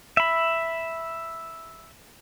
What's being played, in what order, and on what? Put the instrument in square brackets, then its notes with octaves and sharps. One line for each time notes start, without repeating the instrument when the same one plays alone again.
[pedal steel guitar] E5 B5